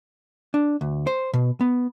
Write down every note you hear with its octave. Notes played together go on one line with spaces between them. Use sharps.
D4
D2
C5
B2
B3